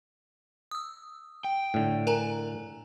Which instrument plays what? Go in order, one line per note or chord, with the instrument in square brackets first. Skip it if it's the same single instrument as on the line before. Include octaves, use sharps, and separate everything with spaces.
[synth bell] D#6 E6
[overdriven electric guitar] G5
[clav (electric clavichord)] A2 D3
[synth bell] A#4 G#5 A#5